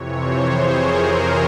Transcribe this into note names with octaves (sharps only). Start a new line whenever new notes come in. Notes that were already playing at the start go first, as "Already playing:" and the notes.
Already playing: F2 C3 E3 C#5
C5
G#4
A#4